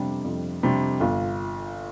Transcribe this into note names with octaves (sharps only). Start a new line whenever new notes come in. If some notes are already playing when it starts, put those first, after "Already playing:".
Already playing: F2 C3 G3 D4
F2
C3 G3 D4
G1 F4